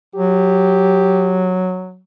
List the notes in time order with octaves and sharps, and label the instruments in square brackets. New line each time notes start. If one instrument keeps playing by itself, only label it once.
[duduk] F#3 [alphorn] G4